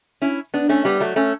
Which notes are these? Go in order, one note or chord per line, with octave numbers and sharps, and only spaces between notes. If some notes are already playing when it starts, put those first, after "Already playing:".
C#4 E4
B3 D4
A3 C#4
G3 B3
F#3 A3
A3 C#4